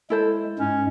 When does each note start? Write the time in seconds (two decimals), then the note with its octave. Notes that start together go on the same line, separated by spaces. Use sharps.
0.10 G#3 E4 A4 C5
0.59 G#2 G#3 C#4